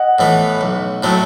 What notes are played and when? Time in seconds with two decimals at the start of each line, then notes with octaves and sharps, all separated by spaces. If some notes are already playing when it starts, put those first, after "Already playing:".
Already playing: D#5 F#5
0.19 A2 E3 B3
0.61 B1
1.03 A2 F#3 A3 C4